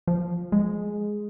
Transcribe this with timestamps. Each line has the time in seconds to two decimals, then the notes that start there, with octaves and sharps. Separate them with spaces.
0.07 F3
0.52 G#3